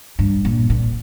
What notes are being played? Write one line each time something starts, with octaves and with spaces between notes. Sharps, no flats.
G2
A#2
A#2